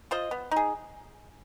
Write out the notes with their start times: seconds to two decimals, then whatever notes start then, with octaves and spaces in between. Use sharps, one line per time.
0.11 F4 C5 D#5
0.31 B3
0.51 D#4 G#4